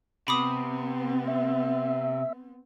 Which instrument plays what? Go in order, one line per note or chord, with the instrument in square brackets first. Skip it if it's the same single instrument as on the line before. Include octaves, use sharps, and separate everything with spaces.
[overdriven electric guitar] C3 [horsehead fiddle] B3 C4 [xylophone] B5 D6 D#6
[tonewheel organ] E5